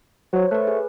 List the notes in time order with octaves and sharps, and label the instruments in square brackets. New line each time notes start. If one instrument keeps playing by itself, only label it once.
[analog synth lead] F#3 [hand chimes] C5 C#5
[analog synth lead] A3 [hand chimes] B4 F#6
[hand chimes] G#4